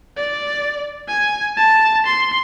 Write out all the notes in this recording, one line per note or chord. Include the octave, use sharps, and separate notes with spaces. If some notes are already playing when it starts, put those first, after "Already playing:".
D5
G#5
A5
C6